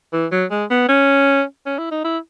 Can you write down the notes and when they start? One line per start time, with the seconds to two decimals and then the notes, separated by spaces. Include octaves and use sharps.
0.13 E3
0.32 F#3
0.51 G#3
0.70 B3
0.89 C#4
1.66 C#4
1.79 E4
1.91 D#4
2.05 E4